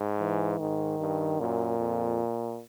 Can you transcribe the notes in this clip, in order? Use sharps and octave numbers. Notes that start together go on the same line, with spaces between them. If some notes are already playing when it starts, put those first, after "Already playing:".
Already playing: G#2
E3
G#2 D#3
G2
F#2 A#2
F2